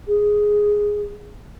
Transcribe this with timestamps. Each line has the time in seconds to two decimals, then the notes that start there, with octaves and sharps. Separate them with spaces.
0.08 G#4